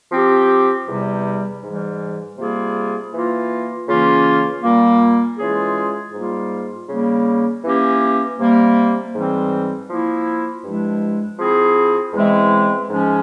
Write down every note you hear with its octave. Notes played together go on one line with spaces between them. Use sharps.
F3 C4 G4
E2 C3 G3
G#2 E3 G3
C3 G3 A#3 F4 G#4
E3 A#3 F4
C#3 E3 A#3 C#4 F4
A#2 G3 A#3
E3 G#3 C#4 F4 G#4
G#2 G3 A#3 F4
C#3 G3 A#3
E3 A#3 C#4 G4
C3 G3 A#3
G#2 E3 G3 C4
F3 A#3 E4
G2 F3 G#3 E4
F3 C4 E4 G#4
E2 E3 G#3 C4 E4
G#2 F3 G#3 C#4